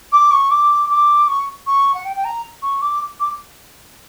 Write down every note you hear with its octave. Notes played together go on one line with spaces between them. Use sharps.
D6
C#6
D6
D6
C#6
C#6
F#5
G5
G5
A#5
C#6
D6
D6